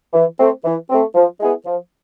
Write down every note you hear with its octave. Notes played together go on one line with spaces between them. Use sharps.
E3
A3 C4
E3
A3 C4
F3
G#3 B3 E4 G#4
F3